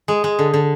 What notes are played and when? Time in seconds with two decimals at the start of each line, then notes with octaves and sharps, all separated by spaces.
0.08 G#3
0.24 G#3
0.39 D3
0.54 D3